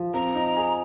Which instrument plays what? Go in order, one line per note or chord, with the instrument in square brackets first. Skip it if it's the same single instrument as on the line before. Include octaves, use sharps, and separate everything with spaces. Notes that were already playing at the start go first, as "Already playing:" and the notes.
Already playing: [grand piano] F3
[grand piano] C4 [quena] A#5
[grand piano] D#4
G#4